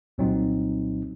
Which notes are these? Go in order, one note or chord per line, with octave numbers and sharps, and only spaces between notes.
C2 A#2 F#3 C4 D#4